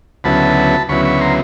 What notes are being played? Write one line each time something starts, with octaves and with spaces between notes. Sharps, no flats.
D2 C#3 F#3 B3 E4 A5 B5
D2 C#3 F#3 B3 E4 B5 C#6
B5 C#6
A#5 C6